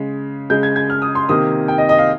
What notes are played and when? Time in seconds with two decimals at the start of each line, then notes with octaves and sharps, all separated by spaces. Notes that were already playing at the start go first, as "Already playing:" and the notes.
Already playing: C#3 G#3
0.50 C#3 G#3 G6
0.63 G#6
0.76 G#6
0.90 F6
1.02 D#6
1.15 C6
1.29 C3 D#3 A#3 D#6
1.68 G5
1.78 D#5
1.89 D#5
1.99 F5